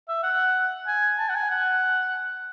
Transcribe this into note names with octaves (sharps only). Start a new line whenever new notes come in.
E5
F#5
G#5
A5
F#5
G#5
F#5